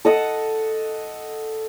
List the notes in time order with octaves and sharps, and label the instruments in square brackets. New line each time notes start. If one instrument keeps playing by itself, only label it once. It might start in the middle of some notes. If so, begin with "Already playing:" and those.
[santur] A4 D#5 F#5 A5